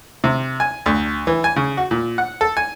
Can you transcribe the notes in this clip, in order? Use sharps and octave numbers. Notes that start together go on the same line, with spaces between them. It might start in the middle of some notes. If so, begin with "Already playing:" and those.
C3
G#5
D2
E3
G#5
C#3
F#4
A#2
F#5
A4
G#5